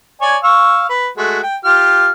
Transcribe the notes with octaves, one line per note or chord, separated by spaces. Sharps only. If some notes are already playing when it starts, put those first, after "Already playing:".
C#5 D5 G#5
F5 C#6 E6
B4
G#3 A3 F#4
G5
F4 G4 F6